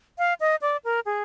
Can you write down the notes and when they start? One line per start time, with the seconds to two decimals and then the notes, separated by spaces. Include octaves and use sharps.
0.18 F5
0.40 D#5
0.62 D5
0.85 A#4
1.06 G#4